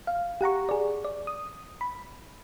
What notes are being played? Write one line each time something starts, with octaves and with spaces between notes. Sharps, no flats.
F5
G4 F#5 A#5 C#6
G#4 D5
D5
D#6
B5